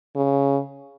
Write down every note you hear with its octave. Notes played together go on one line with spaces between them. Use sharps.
C#3